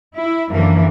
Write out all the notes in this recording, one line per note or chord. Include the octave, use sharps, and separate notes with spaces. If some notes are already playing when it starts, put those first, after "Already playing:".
E4
F#2 D3 E3 F3 A#3